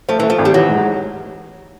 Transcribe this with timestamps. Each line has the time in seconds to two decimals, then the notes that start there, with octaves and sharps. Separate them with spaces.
0.09 F3 A3
0.20 E3 A3
0.30 F3
0.38 G#1
0.45 G3
0.53 E3 F#3
0.69 G#2